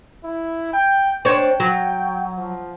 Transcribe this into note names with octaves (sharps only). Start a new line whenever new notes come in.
E4
G5
D4 C5 C#5 G5
F#3
F3